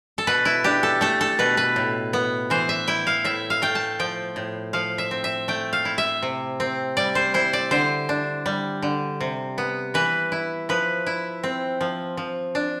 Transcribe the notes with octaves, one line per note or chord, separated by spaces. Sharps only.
A4
B2 B4
E4
D4 G4
A4
A3 A4
A4
B2 B4
B4
A2
B3
E3 C5
E5
E4 G5
F5
A2 E5
F5
A3 G5
A5
F3 G5
A2
F3 F5
E5
C4
E5
A3 G5
F5
E4
E5
C3
C4
G3 D5
C5
E4 C5
D5
D3 C5
D4
G3
D3
C3
B3
E3 B4
E4
F3 B4
E4
C4
F3
F3
D4